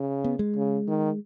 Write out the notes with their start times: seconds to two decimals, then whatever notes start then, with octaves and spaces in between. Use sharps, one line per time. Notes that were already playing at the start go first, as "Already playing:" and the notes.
Already playing: C#3
0.24 B3
0.39 G#3
0.56 C#3
0.88 D#3